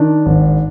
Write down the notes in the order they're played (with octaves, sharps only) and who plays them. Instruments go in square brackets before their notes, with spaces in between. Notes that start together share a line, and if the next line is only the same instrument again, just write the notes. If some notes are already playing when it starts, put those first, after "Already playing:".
Already playing: [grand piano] D#3 D4
G#1